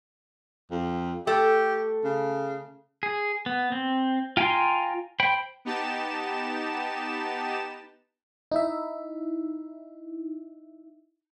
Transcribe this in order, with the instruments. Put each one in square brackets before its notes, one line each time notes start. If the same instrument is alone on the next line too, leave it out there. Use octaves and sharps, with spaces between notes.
[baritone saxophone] F2
[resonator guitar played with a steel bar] A3 [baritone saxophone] G4
[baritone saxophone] C#3
[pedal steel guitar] G#4
B3
C4
F4 G5 G#5 A#5 C6
C5 G5 B5
[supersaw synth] B3 D#4 G4 A5 E7
[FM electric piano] D#4 E4 E5